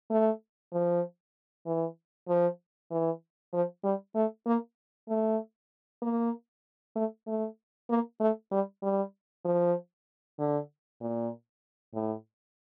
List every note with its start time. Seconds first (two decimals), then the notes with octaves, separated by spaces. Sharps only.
0.10 A3
0.73 F3
1.66 E3
2.28 F3
2.91 E3
3.53 F3
3.84 G3
4.15 A3
4.46 A#3
5.09 A3
6.02 A#3
6.96 A3
7.27 A3
7.90 A#3
8.20 A3
8.51 G3
8.83 G3
9.45 F3
10.39 D3
11.01 A#2
11.94 A2